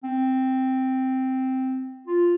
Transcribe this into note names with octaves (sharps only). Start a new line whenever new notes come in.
C4
F4